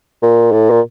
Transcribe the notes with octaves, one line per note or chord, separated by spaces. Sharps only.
A#2
A2
A#2